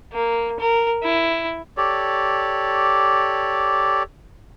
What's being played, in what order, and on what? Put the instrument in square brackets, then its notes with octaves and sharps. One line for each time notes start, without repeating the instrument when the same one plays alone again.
[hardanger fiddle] A#3
A#4
E4
[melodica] G4 A4 C#5 D5